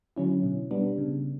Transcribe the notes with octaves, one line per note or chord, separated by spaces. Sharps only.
D3 F#3 C#4 E4
B2
G3 B3 D4
C#3